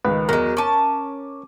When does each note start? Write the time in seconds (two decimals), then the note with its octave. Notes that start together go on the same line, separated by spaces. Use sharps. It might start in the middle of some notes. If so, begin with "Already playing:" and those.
0.05 C#2 D#3 B4
0.29 E2 F#3 G#3 A#4
0.57 C#4 A5 D6 D#7